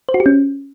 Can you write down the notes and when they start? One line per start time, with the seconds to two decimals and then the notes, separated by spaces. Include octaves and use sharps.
0.09 C5
0.14 F#4
0.20 G4
0.26 C#4